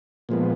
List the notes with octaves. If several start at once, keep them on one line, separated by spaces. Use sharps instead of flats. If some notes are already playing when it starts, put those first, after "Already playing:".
A#2 F3 G#3 B3